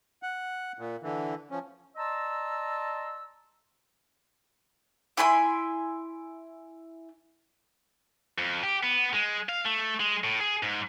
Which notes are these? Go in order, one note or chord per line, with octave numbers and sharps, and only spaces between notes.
F#5
A#2
D3 E3
F3 C#4
D5 D#5 A5 A#5 C6 E6
E4 G#5 B5 C6
F2
G4
B3
G#3
F5
A3
G#3
A2
G#4
G#2